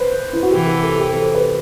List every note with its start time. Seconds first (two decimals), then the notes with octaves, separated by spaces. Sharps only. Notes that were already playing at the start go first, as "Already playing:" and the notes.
Already playing: B4 C5
0.33 E4
0.43 F#4
0.52 C3 E3 G4
0.67 G4
0.83 A4
1.00 G4
1.11 A4
1.22 C5
1.35 B4